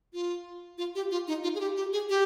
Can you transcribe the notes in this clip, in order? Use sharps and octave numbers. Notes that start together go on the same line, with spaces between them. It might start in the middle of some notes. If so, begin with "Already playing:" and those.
F4
F4
G4
F4
D#4
F4
G#4
G4
G4
G#4
G4